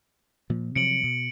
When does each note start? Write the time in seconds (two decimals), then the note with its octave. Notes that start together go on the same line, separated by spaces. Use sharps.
0.50 A#2 F3
0.76 C3 F3 F#3 C#7 D7 F#7
1.03 B2